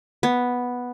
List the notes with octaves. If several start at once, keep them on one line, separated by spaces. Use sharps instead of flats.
B3